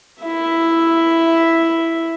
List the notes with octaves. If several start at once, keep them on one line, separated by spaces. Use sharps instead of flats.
E4 E5